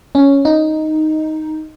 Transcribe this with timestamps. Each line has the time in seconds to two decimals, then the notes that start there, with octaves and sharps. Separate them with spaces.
0.15 C#4
0.45 D#4